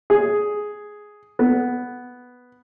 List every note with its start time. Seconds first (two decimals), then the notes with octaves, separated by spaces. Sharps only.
0.10 G#4
1.39 B3